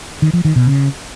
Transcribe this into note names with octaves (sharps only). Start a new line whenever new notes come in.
D#3
F3
D#3
B2
C#3